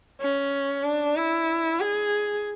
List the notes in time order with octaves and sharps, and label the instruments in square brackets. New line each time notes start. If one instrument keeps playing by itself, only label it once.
[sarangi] C#4
D4
E4
G#4